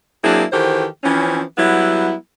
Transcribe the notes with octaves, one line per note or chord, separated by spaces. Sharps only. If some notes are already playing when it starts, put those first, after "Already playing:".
F#3 A#3 C4 D4 E4 G#4
D#3 E3 F#4 G4 A4 C5
E3 F3 C4 C#4
F#3 G3 B3 E4